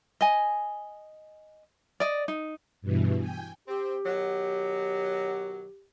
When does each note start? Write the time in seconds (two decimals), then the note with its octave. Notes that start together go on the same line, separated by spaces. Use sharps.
0.21 D#5 G#5
2.00 D5 D#5
2.28 D#4
2.82 G2 B2 E3
3.19 G5 G#5
3.68 C4 G4
4.06 B2 D#3 F#3